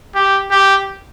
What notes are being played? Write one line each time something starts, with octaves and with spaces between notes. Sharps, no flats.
G4
G4